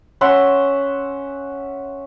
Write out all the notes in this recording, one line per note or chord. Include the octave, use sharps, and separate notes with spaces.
C#4 E5 F#5 C6